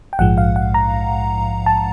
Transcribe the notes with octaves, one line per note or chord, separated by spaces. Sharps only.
G5
A#1 G#2 F3 G#3 F#5
F5
F#5
A#5
A5